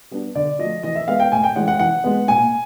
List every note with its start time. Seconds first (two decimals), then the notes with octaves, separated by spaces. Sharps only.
0.11 G3 B3 D4
0.35 D3 D5
0.59 F3 A3 D#5
0.83 E3 D#5
0.95 E5
1.07 G#3 B3 F5
1.20 G5
1.32 A2 G#5
1.44 G5
1.56 E3 G#3 C#4 F#5
1.68 F#5
1.79 E3 F#5
2.04 G#3 B3
2.28 A#2 G#5